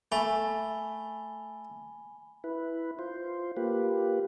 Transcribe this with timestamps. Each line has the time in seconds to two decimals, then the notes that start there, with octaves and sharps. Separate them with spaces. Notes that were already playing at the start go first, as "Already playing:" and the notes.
0.12 A3 G#5 B5 G7
2.44 E4 B4
2.99 F4 C5
3.57 A#3 F4 G4 B4